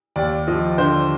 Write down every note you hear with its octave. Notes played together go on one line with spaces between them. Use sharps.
D#2 D5
F3 D#5
D3 C5